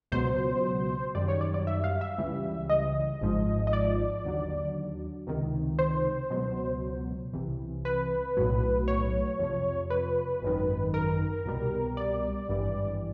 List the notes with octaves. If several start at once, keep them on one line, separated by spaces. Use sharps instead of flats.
C#2 B2 F#3 C5
F#2 D#3 G3 D5
C#5
D5
D5
E5
F5
E5
C#2 C#3 E3 G3
D#5
G#1 G#2 F3
D#5
D5
D#2 D3 F#3
C#2 C3 D#3
C5
C#2 B2 F#3
C2 C3 E3
B4
B1 A2 F#3
C#5
F2 C3 F3
B4
G#1 F#2 D#3
A#4
C2 B2 G3
D5
G#1 G2 E3 G3